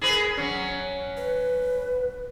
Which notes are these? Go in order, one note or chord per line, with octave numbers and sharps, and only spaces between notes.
G#4 A#4 B4
F#3 C#4
B4